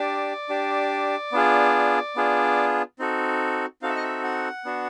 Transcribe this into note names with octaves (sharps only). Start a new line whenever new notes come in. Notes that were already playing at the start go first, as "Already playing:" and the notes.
Already playing: D4 G4 D5
D4 G4
B3 D4 F4 G#4
B3 D4 F4 G#4
C4 D#4 F#4 A4
C4 D#4 F#4 A4 F5
E5
D#5
E5
F#5
B3 D4 F#4